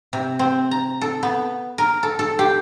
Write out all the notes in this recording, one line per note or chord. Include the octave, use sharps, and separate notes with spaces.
C3
C4
A#5
A4
B3
A#4
A4
A4
G4